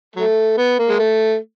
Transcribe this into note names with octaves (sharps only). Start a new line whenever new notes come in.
F#3 A3
B3
A#3
G#3
A3